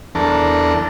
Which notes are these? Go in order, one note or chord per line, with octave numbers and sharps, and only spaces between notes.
E2 D4 A4 A#4